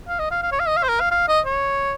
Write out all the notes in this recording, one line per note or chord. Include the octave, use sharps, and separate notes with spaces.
F5
D#5
F5
F5
C#5
F5
D#5
F5
C5
A#4
F5
F5
D#5
C#5